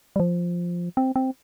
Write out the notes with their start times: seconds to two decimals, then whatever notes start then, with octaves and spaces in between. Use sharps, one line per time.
0.16 G3
0.20 F3
0.97 C4
1.16 C4